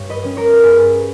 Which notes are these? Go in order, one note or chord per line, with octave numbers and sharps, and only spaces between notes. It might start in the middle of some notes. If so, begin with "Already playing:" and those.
Already playing: G2 C#5
B4 D#5
G3 C#4
A#4 C#5
G2 G#4 B4